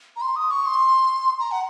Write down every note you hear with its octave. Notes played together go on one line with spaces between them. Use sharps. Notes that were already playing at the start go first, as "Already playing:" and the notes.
A#5
C6
D#6
C#6
C6
A#5
F#5